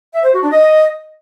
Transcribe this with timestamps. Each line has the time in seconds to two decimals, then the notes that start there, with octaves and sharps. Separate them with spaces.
0.15 E5
0.24 C5
0.33 F#4
0.42 D4
0.52 D#5